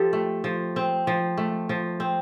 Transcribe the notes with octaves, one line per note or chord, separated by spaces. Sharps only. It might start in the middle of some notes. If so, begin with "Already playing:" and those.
Already playing: F3 C4 G4 A4
A3
F3
C4
F3
A3
F3
C4